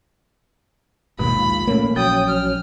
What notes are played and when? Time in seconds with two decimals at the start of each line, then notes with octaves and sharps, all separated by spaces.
1.19 A#1 D#2 G#2 B2 F4 B5
1.67 A#2 A3 A#3 C#4
1.96 A#1 F3 F#3 C#4 G5 D#6
2.28 F6